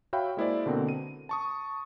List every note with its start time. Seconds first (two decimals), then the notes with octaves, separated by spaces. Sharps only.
0.13 F#4 C#5 E5 F5 G5 B5
0.37 G#3 A#3 E4 G#4 C5 D5
0.66 B2 D3 A#3 C4 A#4
0.89 D#7
1.29 A5 C#6 D#6